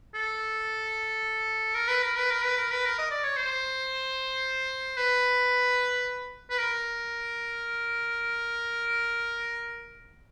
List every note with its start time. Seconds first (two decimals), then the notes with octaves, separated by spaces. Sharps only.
0.15 A4
1.75 A#4
1.88 B4
2.03 A#4
2.17 B4
2.31 A#4
2.44 B4
2.58 A#4
2.71 B4
2.85 A#4
2.98 D#5
3.11 D5
3.24 C#5
3.37 C5
4.97 B4
6.50 B4
6.58 A#4